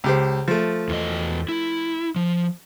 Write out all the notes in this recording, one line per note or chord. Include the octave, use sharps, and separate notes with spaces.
C#2 G4 C5
F3 A3
E2 D#5
E4
F3